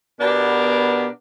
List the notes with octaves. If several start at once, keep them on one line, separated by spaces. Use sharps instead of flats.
B2 B3 D4 G4 A#4